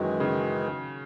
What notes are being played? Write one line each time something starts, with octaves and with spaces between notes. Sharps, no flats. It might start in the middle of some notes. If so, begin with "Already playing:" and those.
Already playing: F#2 D#3 E3 F#3 G#3
C#3
D#3